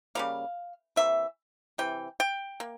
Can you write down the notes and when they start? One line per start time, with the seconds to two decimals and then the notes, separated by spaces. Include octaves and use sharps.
0.15 C#3 G3 A#3 F5
0.96 C3 E3 A#3 E5
1.78 C3 E3 G5
2.20 G5
2.60 A#3